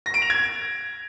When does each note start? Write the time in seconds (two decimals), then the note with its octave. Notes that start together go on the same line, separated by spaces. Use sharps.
0.06 A#6
0.14 D7
0.22 F7
0.30 G#6